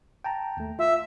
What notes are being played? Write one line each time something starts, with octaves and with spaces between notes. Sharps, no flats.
G5 A5 A#5
D#2 A3
F4 E5